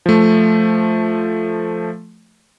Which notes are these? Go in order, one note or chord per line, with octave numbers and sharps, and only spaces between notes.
F3 A3